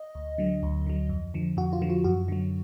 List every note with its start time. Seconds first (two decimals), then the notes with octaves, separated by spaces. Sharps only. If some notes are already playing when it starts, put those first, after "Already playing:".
Already playing: D#5
0.15 D2
0.38 D3 F#3
0.63 D2
0.86 D3 F#3
1.09 F2
1.34 D3 F3
1.57 F2 F#4
1.73 F4
1.82 D3 F3
1.90 F4
2.04 F#2 F#4
2.28 D3 F#3